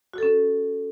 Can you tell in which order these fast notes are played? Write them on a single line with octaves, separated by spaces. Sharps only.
F#4 A4 C#4